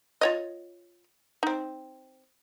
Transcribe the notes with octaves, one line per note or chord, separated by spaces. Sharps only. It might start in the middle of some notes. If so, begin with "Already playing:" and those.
F4 C#5 D#5
C4 D#4